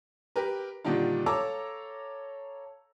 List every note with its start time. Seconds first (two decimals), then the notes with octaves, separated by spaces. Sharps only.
0.36 G4 A#4 B4
0.85 A#2 D3 D#3 G3 D4 F4
1.26 A4 C#5 F5 A#5 D6 E6